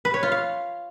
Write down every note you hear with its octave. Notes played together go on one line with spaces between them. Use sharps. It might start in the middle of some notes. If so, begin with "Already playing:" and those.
B4
C#5
F4
F5